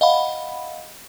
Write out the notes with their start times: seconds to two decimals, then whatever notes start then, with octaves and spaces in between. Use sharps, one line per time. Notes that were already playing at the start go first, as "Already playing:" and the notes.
0.01 D#5 F5 F#5 B5